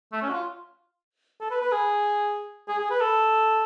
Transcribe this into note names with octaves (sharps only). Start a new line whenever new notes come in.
A3
C#4
F#4
F4
A4
B4
B4
G#4
G#4
G#4
B4
A4